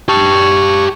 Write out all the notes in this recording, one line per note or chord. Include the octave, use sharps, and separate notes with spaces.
G4 A5 C#6